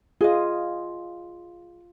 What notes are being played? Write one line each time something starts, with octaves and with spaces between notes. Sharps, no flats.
F4 G#4 D#5